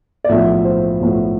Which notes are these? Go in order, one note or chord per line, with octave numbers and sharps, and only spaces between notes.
D5
B1 A2 F3 B3 E5
C5
B1 A2 F3 B3